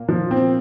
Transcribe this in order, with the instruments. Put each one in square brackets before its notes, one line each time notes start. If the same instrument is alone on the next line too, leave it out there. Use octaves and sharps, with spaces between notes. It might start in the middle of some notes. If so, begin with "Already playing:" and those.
Already playing: [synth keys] A#2 A#3
[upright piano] F3
C4